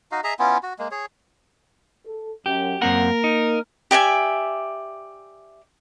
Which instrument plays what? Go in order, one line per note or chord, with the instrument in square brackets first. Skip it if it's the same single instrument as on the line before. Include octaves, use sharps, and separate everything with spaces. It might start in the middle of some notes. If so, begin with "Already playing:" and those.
[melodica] D#4 F#4 D#5 F5
G#4 D#5 E5 A#5
B3 C#4 E4 F4
F#4
G#3 A#3
G#4 C#5
[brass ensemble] A4
[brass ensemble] F#2 [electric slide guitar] G4
[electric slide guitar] F#2 C4 F#5 [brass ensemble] A#3 [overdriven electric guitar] A#4
[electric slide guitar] D#4
[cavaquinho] G4 D5 E5 G#5